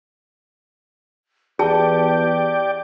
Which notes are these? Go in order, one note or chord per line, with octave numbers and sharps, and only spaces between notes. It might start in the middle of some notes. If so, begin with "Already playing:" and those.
E2 G4 G#4 D5 G5 A5